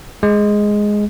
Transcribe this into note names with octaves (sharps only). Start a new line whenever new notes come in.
G#3